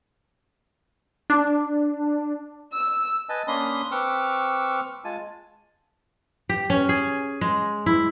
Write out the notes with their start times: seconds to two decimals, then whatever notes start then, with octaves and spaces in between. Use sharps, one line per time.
1.30 D4
2.72 E6
3.29 B4 D#5 G#5 A5
3.48 A#3 C#4 D4 B5 C6 D#6
3.91 C4 B4 C#6 D6 E6 F6
5.04 G#3 F4 G#5 A5
6.49 G4
6.70 C#4
6.89 G#4
7.41 G#3
7.86 E4